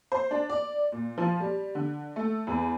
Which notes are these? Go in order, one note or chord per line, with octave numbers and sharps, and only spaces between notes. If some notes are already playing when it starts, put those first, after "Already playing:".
C5
D4
D5
A#2
F3
G3
D3
A3
E2